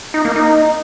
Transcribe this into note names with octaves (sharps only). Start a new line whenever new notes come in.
D#4
A#3
D#4